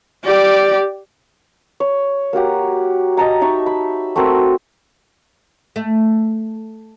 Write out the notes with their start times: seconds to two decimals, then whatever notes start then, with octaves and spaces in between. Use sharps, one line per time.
0.24 G4 D5
1.80 C#5
2.33 A#3 F#4 G4 F#5
3.17 D#5 A5 A#5
3.41 D#4 E5 A5 C#6
3.66 B5
4.16 A3 C4 F#4 A#4
5.76 A3